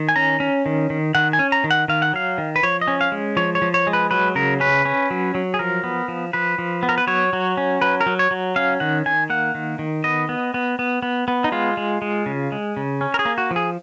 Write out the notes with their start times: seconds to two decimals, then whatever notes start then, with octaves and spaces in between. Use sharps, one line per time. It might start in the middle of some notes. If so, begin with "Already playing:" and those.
Already playing: D#3
0.09 G#5
0.16 C#4 A#5
0.40 C#4
0.66 D#3
0.90 D#3
1.15 D#3 F#5
1.33 G#5
1.39 C#4
1.52 A#5
1.64 D#3
1.71 F#5
1.88 D#3 F5
2.02 F#5
2.13 F#3 F5
2.38 D#3
2.56 B4
2.63 F3 C#5
2.81 D#5
2.88 C#4
3.01 F5
3.12 G#3
3.37 F3 C#5
3.55 C#5
3.62 F3
3.74 C#5
3.87 G#3
3.93 B4
4.11 F#3 B4
4.35 C#3 A#4
4.60 C#4 B4
4.85 C#4
5.11 F#3
5.35 F#3
5.54 G#4
5.59 F3 A#4
5.84 B3
6.08 F3
6.33 F3 B4
6.59 F3
6.83 B3
6.89 A#4
6.98 B4
7.07 F#3 C#5
7.33 F#3
7.57 C#4
7.81 F#3 B4
8.01 A#4
8.06 F#3
8.19 C#5
8.31 F#3
8.56 C#4 F5
8.80 D#3 F#5
9.06 D#3 G#5
9.30 A#3 F#5
9.55 D#3
9.79 D#3
10.04 B3 D#5
10.29 B3
10.54 B3
10.79 B3
11.03 B3
11.28 B3
11.44 D#4
11.52 G#3 F4
11.77 G#3
12.02 G#3
12.26 C#3
12.52 G#3
12.77 C#3
13.01 C#4
13.14 A#4
13.19 G#4
13.25 A#3
13.38 F#4
13.51 F3
13.56 G#4